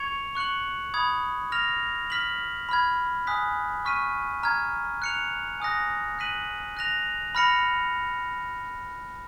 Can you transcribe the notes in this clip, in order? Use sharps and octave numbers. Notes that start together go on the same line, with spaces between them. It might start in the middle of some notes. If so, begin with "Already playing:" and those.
Already playing: C#6 G#6 C#7 F7
C#6 F#6 C#7 F#7
B5 D#6 G#6
F6 A#6 F7
F6 B6 F#7
B5 F6 G#6
G#5 D#6 F#6 B6
C#6 F6 B6 D#7
A#5 F6 G#6
F#6 C#7 F7
G#5 D#6 F#6 A#6
F#6 B6 D#7 F#7
F#6 A#6 F7
B5 F6 A#6 C#7 F7